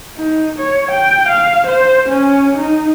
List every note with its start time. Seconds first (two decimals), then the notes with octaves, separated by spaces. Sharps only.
0.17 D#4
0.58 C#5
0.91 G5
1.28 F5
1.67 C5
2.09 C#4
2.57 D#4